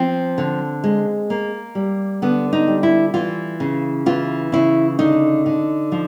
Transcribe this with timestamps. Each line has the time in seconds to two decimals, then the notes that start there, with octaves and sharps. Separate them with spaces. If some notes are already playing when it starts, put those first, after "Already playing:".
Already playing: F3 C4
0.38 D3
0.84 G#3
1.30 A#3
1.75 G3
2.22 D3 B3
2.53 D#4
2.68 G3
2.83 E4
3.14 E3 F4
3.60 C#3
4.06 E3 F4
4.52 C#3 E4
4.99 D3 D#4
5.46 D3
5.92 F3